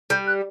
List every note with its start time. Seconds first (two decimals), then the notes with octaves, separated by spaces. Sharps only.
0.10 G3 G6
0.27 F#6